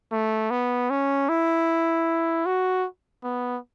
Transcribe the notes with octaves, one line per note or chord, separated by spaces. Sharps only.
A3
B3
C#4
E4
F#4
B3